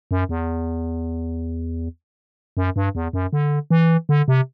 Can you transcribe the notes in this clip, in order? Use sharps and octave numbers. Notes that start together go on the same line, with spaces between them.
F#2
E2
F#2
G2
E2
F#2
D3
E3
D3
C3